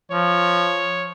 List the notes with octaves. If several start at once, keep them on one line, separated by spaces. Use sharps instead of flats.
F3 C#5